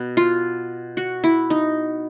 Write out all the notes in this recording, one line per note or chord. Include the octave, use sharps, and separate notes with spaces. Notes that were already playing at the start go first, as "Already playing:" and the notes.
Already playing: B2
F4
F#4
E4
D#4